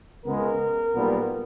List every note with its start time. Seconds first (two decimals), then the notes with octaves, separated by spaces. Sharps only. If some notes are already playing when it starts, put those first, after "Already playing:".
0.24 C#2 C#3 G#3 B3 A#4
0.94 B1 A#2 G3 B3